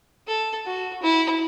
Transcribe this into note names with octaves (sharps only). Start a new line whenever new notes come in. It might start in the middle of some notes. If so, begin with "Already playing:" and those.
A4
F#4
E4